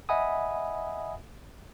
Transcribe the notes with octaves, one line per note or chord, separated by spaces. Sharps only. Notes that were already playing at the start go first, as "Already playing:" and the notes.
D#5 E5 F#5 G#5 B5 D#6